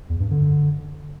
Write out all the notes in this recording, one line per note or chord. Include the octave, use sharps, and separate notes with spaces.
E2
G2
D3